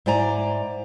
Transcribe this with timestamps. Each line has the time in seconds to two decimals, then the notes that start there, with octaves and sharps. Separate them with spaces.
0.06 G#2 E4 C5 D5 G#5 A#5